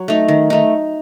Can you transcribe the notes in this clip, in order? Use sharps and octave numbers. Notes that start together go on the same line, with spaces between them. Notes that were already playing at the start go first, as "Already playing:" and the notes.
Already playing: F#3
A3 D#4
D#3
A3 D#4